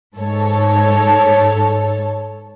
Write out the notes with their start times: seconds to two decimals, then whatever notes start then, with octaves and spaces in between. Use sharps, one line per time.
0.17 G#2 A4 C#5